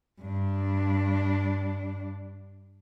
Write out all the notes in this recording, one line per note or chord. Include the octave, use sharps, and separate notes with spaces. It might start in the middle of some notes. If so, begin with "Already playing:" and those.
G2 D4